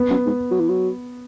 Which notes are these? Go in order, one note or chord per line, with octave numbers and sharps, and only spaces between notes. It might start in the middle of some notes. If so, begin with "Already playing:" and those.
Already playing: B3
F#2
G#2
F#3
E3
F#3